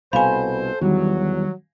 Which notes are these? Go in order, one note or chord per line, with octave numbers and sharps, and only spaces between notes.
C2 B2 A4 C5 F5 G#5 B5
E2 D#3 F#3 G3